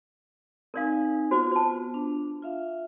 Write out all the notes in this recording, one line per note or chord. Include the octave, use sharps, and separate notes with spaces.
C4 D#4 A#4 D5 F5 G#5
B3 F4 F#4 B4 C5
C5 A5
D4
F4 E5 F5